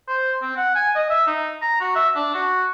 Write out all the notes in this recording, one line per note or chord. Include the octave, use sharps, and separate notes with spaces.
C5
C4
F#5
G#5
D#5
E5
D#4
A#5
F#4
E5
D4
F#4